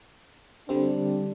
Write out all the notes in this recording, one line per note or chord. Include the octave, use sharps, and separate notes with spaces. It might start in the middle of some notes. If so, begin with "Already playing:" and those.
D3 G3 C4 D4